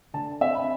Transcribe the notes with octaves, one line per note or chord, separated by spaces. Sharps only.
D3 A5
C4 E5
B5